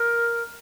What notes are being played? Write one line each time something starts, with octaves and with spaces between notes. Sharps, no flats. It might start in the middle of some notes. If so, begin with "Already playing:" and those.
Already playing: A#4